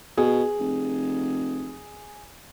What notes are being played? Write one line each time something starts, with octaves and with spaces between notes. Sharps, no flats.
B2 G#4
F1